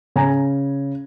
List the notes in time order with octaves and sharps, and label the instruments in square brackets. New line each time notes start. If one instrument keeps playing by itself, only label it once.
[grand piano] C#3 G#5 A#5